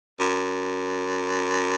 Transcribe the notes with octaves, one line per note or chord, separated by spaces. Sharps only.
F#2